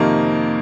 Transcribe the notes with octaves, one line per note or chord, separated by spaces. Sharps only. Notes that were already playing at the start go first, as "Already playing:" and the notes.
Already playing: F2 C3 D#3 A#3 D#4